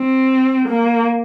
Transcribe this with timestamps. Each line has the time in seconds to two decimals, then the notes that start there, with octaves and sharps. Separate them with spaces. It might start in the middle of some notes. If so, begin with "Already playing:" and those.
Already playing: C4
0.69 A#3